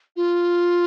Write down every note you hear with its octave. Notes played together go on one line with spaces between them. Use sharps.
F4